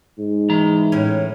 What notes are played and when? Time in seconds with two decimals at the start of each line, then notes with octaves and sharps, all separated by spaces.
0.19 G#2
0.49 E3 A#5
0.92 A2 C#4